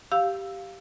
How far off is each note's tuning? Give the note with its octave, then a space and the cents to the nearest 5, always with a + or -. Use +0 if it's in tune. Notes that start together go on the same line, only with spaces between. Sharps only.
G4 -5 F5 +0 E6 +0